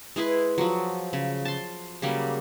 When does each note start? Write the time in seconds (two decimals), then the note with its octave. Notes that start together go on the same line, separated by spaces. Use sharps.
0.16 G#3 E4 G#4 B4
0.58 F3 F#3
1.13 C#3
1.45 A5 C6
2.02 C#3 F#3 G3 A#3